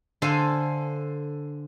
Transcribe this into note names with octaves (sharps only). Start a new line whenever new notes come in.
D3 A4 C5 F5 G#5